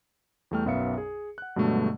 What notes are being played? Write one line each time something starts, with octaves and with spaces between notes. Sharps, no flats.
E2 G3 A3 G5 F6
B1 F#2 B3 E5 F5 C#7
G#4
F#5 F#6
G2 B2 D3 F#3 G#3 A3